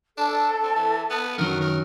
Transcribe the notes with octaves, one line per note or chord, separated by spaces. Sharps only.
D4 A4
C4
E3
B3
F#2 D#3 F#3 A#4
A#4